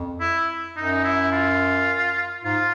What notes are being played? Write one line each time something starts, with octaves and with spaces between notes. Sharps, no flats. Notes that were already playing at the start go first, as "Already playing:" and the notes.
Already playing: F2
E4
F#2 D#4
E4
F4
G#2 F4